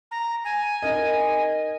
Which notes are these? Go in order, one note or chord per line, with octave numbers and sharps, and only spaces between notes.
A#5
G#5
D#4 A#4 D#5